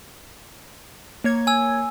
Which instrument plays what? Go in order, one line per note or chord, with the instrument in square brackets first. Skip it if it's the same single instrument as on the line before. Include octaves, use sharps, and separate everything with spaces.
[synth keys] A#3 C#5 G#6
[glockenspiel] G#5 E6